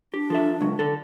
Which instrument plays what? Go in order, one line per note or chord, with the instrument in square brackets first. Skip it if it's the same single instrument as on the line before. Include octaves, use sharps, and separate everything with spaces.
[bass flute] D4 [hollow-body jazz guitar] G4
[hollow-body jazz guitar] F3 A4 E5
C#2 F#3
D3 A4